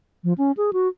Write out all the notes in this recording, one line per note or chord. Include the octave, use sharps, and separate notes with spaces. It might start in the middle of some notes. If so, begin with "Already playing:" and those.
F3
C#4
G#4
F#4